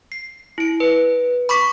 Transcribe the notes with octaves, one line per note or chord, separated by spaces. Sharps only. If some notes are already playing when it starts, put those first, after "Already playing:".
C7
E4 D7
B4
B5 C#6 D6 B6